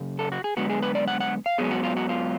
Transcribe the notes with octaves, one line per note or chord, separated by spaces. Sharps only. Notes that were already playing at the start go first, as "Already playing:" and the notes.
Already playing: F#2 C#3
A4
F#4
G#4
F#2 D3 G#3 B3 F#4
G#4
B4
D5
F#5
F#5
F5
G#2 F#3 B3 G#4
F#4
F4
F#4
F4